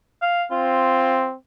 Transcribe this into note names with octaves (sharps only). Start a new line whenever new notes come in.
F5
C4 F4